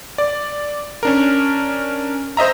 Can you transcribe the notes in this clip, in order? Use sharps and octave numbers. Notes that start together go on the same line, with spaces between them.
D5
C#4 D4 A#4
C5 D#5 E5 A#5